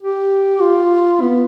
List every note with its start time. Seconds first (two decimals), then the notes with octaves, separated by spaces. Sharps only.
0.03 G4
0.61 F4
1.21 B3